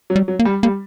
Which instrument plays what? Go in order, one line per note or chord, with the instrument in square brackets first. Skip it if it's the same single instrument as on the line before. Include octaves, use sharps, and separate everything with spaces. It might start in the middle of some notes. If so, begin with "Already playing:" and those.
[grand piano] F#3
[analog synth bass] G3
[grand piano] F#3
[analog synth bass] A#3
[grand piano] G3
[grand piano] G3 [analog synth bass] A#3